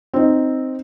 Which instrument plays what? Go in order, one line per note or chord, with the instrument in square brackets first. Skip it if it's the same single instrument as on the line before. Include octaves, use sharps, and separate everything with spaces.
[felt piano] C4 D#4